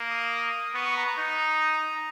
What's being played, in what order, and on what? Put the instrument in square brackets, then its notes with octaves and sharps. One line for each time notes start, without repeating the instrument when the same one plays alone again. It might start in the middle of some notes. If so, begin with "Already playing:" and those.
Already playing: [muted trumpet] A#3
[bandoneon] D#6
[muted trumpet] B3 [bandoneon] C#6
[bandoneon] C#6
A#5
A#5
[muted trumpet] D#4 [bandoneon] A#5